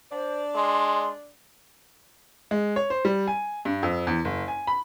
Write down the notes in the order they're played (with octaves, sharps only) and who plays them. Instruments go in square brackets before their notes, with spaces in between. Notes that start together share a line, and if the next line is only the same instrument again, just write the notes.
[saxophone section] D4 D5 [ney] C5
[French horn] G#3 [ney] C6
[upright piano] G#3
C#5
C5
G3
G#5
G2
F2
E2
F#1
G#5
B5